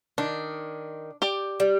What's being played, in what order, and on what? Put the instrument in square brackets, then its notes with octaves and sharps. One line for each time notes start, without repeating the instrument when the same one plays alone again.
[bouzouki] D#3 [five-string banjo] D4
[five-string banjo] G4 D5
[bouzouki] G3